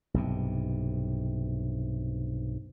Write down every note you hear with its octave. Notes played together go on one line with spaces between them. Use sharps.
B1 G2 C3